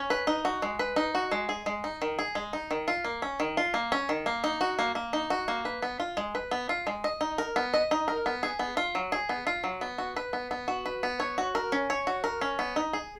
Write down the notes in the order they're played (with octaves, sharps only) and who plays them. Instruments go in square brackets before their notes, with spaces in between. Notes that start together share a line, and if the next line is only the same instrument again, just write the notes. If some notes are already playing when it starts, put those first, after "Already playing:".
Already playing: [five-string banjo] C#4
B4
D#4
F#4
G#3
B4
D#4
F#4
G#3
G#4
G#3
D#4
D#3
G#4
G#3
D#4
D#3
F4
A#3
C#4
D#3
F4
A#3
C#4
D#3
A#3
D#4
F#4
A#3
A#3
D#4
F#4
A#3
B4
B3
F4
G#3
B4
B3
F4
G#3
D#5
D#4
A#4
B3
D#5
D#4
A#4
B3
G#4
B3
F4
F#3
G#4
B3
F4
F#3
B3
F#4
B4
B3
B3
F#4
B4
B3
C#5
F#4
A#4
C#4
C#5
F#4
A#4
C#4
B3
D#4
G#4